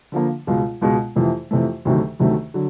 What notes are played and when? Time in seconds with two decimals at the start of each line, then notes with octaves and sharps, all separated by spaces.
0.12 D3 F3 A#3
0.47 C#2 B2 G#3
0.81 C#2 B2 G#3
1.16 F2 C3 E3 A3
1.51 F2 C3 E3 A3
1.85 D2 C3 D#3 F#3 A3
2.19 D2 C3 D#3 F#3 A3
2.54 D3 F#3